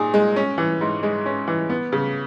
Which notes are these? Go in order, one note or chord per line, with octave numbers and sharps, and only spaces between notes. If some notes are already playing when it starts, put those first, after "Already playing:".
Already playing: A#2 D#4 G#4
G#3
C#4
E3
G#2
G#3
C#4
E3
B3
C#3